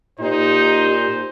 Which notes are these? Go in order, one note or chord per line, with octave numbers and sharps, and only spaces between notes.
A#2 D#4 G4 C5